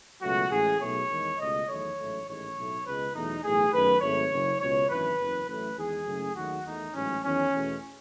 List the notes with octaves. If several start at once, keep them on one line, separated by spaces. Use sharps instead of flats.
C#2 B2 F#3 A3 F#4
A1 A2 G#3 G#4
B1 B2 A3 C#5
E2 D#3 G#3
C#2 B2 A3 D#5
E2 D#3 F#3 A3 C#5
A1 G#2 F#3 A3
A1 G#2 D#3 G#3 C#5
B1 A2 F#3 A3
C#2 B2 G#3 B4
E2 B2 F#3 A3 D#4
B1 A2 E3 A3 G#4
F#2 D#3 A3 B4
G#1 G#2 F#3 A3 C#5
F#1 F#2 C#3
C#2 B2 G#3 C#5
G#1 F#2 C#3 E3 B4
F#1 E2 C#3
A1 A2 F#3 A3 B4
E2 D#3 G#3 G#4
F#1 F#2 C#3 F#3 A3
D#2 D#3 F#3 A3 F#4
E2 D#3 A3 D#4
A1 G#2 F#3 A3 C#4
E2 D#3 F#3 C#4
E2 B2 A3